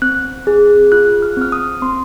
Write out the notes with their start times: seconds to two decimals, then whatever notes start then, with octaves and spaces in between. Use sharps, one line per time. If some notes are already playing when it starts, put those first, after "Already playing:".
0.02 C4 F#6
0.47 G#4
0.92 F4 F#6
1.22 F6
1.37 C4 F6
1.52 D#6
1.82 C4 C6